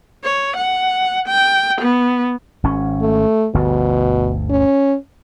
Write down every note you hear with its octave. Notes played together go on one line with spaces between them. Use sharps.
C#5
F#5
G5
B3
G#1 C#4
A3
G1 D2 B2
C#4